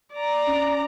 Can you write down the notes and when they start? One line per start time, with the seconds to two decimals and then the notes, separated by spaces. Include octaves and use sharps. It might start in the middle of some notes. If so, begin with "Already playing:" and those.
0.14 D5 A#5
0.47 C#4